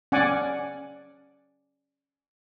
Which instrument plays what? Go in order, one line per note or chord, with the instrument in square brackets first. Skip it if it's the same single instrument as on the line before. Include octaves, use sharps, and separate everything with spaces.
[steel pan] C#4 D5 F#5 G#5 D6